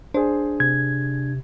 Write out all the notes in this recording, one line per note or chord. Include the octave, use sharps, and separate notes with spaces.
D4 G#4 C5
C3 G#6